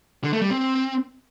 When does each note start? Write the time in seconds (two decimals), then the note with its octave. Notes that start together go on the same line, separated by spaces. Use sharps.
0.24 D3
0.33 A3
0.41 G3
0.50 C4